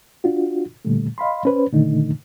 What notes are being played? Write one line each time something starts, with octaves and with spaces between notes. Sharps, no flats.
D4 F4 F#4
A#2 D3 G3 A3
D#5 F5 B5 C6
C#4 B4 C5
A#2 D3 D#3 A3 D4 D#4